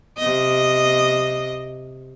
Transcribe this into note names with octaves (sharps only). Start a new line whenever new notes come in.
C3 D#5